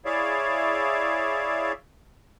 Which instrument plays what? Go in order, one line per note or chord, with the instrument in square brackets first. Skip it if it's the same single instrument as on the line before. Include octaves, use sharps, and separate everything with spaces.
[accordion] E4 G#4 C#5 D5 E5 F5